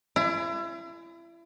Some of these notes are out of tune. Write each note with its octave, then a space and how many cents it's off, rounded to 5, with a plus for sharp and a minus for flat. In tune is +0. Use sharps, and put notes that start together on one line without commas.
E4 +35